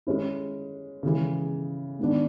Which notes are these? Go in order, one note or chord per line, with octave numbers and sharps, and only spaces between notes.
G#3 C#4 E4
C#3 E3 G#3
G#2 D#3 G#3 B3 D4